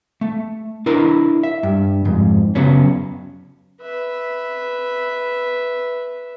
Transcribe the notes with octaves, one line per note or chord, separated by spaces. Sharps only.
A3
D4 E4 A#4 B4
E5
G2
F2 G#2
F#2 C#3 F#3 B3 C#4
B4 E5